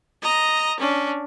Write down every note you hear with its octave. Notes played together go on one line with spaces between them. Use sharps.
D#5 A#5
C#4 D4